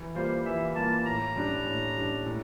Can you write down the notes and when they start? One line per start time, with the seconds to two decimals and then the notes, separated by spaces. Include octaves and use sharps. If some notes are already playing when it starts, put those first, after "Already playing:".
Already playing: E3
0.15 G3 A#3 F4 C5
0.45 E3 E5
0.76 G3 A#3 F4 A5
1.05 A2 A#5
1.36 G3 D4
1.66 A2
1.97 G3 D4
2.26 A2